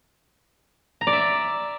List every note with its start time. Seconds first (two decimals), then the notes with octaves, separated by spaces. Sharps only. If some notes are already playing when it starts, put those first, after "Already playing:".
1.01 A#5
1.07 D5
1.13 E5